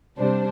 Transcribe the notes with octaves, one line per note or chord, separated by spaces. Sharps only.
C3 G3 D4 C5